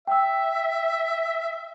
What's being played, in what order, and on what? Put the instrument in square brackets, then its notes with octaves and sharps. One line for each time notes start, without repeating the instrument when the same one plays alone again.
[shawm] E5 [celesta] G5 E6